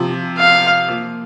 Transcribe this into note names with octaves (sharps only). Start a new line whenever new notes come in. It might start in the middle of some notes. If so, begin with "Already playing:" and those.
Already playing: C3 F3
F5
F3 A#3